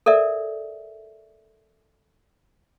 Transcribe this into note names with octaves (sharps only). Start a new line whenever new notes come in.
A4 A#4 D5 E5